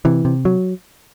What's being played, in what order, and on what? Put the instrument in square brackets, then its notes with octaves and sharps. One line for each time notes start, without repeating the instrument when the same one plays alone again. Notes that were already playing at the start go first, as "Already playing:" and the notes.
[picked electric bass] C3 E3
C3
F#3